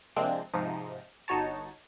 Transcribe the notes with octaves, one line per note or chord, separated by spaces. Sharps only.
C3 F3 G#3 A#3 C4 D4
G#2 C3 F3 D#4
G1 D#4 F#4 C#5 A5